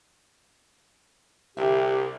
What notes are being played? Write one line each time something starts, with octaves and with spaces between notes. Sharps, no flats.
C2 D3 G4 E5